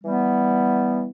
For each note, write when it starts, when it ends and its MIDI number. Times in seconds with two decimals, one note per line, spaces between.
0.04 1.08 52
0.04 1.08 55
0.04 1.08 59